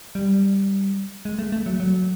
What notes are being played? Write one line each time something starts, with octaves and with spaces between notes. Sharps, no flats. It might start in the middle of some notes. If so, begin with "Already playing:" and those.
G3
G#3
A3
A3
F#3
F#3